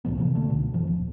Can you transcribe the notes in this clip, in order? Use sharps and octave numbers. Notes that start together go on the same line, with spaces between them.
C2 A2 F3 B3
C3 E3 A#3
D3 A3
C2 B2
F#2 E3 F3
D#1